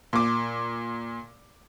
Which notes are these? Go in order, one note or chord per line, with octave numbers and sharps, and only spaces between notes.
A#2 D6